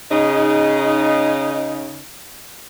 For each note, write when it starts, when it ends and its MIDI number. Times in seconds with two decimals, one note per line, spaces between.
0.11 2.04 49
0.11 2.04 63